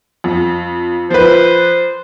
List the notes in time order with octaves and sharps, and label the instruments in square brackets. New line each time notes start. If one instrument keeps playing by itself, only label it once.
[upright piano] F2
[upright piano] F3 B4 [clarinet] C5